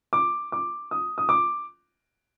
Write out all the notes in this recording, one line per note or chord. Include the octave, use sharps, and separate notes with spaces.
D6
D6
D#6
D#6
D6